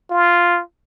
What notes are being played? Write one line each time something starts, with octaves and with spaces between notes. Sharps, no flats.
F4